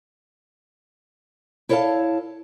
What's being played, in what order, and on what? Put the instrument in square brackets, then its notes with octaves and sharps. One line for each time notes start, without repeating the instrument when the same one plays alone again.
[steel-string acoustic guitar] E4 A4 C#5 D#5 F5 A5